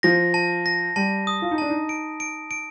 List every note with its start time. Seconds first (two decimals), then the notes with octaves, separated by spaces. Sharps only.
0.03 F3 A#6
0.34 A5
0.66 A#6
0.96 G3 A5
1.27 D#6
1.42 F4
1.51 D#4
1.58 D4 A5
1.70 D#4
1.89 D7
2.20 D7
2.51 D7